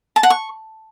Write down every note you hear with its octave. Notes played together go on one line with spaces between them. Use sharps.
A5
F#5
C#6